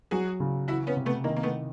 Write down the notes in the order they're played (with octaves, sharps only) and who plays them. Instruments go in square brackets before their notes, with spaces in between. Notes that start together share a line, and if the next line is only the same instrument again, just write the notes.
[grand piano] F#3 [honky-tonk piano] F#4 G#4
[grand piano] C#3
[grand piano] E3 [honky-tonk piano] E4 F#4
[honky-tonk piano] B3 C#4
[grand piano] C3
[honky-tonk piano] A3 B3
[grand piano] D#3 [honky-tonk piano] A#3
[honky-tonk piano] A#3
A3 B3